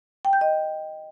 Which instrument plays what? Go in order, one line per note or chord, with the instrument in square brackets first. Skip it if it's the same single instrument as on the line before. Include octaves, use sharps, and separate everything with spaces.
[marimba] G5
G6
D#5